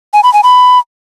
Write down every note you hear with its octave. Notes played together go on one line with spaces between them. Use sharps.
G#5
B5
G#5
B5